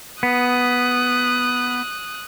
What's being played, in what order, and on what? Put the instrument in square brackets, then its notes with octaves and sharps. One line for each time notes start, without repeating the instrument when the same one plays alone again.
[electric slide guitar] B3 [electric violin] D#6 F#6